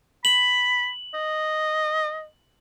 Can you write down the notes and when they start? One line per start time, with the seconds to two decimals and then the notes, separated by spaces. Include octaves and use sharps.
0.25 B5 F#7
1.14 D#5